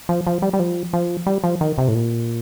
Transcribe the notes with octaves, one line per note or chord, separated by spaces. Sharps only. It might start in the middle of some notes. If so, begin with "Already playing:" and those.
F3
F3
G3
G3
F3
F3
G3
F3
D#3
C3
A2
A#2